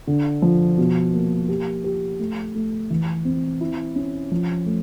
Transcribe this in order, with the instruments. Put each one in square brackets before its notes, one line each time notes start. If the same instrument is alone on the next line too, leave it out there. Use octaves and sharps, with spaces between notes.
[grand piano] D3
F3
B2
A#3
G4
G4
A3
A3
E3
C4
E4
C#4
F3
A3